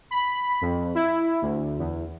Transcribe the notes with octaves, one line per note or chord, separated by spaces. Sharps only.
B5
F2
E4
D2
E2